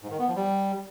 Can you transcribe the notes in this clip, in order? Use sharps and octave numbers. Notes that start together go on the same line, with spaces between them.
G#2
D#3
B3
F3
G3